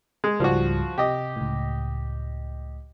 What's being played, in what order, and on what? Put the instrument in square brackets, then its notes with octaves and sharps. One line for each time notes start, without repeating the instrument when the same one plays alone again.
[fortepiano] G#3
[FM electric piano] C#2 G#2 G3 [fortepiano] F3 F#4
[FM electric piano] C3 [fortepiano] G4 D#5
[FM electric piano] C#2 A2